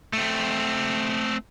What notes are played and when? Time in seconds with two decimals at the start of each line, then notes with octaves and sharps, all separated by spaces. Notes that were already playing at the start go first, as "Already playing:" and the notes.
0.13 A3 C4